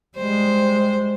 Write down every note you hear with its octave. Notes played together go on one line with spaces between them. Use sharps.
G3 G#3 C5